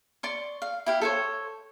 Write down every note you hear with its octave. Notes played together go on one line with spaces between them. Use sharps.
D5 C6 C#6
F5
E4 G4 F5
A4 C5 C#5